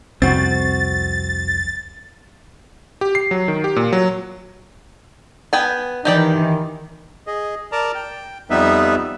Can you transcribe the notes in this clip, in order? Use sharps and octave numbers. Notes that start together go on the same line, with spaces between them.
C2 F2 C4 E4 F#4 A6
G4
C7
F#3
D#3
G4
A#2
F#3
B3 G5 G#5
D#3 E3 D#4 G4 D5
G#4 D#5
A#4 D5 A5 A#5
G5
F2 G3 B3 D#4 B4 E5